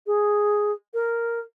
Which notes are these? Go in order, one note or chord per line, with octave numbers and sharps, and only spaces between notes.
G#4
A#4